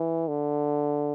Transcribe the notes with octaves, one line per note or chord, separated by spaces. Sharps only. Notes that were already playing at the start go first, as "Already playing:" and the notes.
Already playing: E3
D3